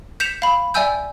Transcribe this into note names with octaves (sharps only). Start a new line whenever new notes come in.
G6 B6 C#7 E7 F7
F5 B5
D5 E5 G5 G#5 E6 G6